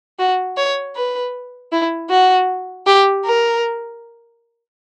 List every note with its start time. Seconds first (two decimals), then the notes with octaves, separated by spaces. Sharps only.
0.19 F#4
0.57 C#5
0.96 B4
1.72 E4
2.10 F#4
2.86 G4
3.25 A#4